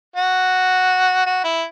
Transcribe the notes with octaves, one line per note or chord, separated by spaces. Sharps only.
F#4
F#4
E4